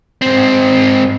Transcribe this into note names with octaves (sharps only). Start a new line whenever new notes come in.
G#2 C4